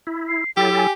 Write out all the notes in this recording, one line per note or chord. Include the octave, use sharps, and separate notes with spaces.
E4
C7
F#3 E4 G4 A4 G5
G#5